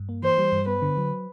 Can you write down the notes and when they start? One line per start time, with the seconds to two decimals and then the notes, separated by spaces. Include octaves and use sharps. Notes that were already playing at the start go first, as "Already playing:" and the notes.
Already playing: G2
0.09 A#3
0.23 E3 C5
0.38 G3
0.52 G2
0.67 B3 B4
0.82 D3
0.97 F#3